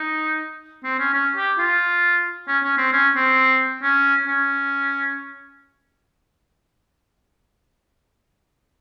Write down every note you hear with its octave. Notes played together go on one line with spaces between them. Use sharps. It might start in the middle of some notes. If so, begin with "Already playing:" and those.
Already playing: D#4
C4
C#4
C#4
G4
F4
C#4
C#4
C4
C#4
C4
C#4
C#4